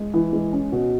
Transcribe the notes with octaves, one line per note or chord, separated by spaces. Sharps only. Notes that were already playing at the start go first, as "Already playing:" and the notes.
Already playing: G#3
E3
G#3
C#4
B2